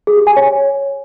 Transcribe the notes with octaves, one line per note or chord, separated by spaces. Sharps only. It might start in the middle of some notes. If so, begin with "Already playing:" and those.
G#4
G4
G#5
C#5